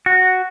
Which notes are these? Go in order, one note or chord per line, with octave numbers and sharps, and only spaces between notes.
F#4